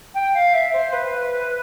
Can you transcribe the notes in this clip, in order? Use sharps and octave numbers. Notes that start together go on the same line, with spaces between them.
G5
F5
E5
C5
B4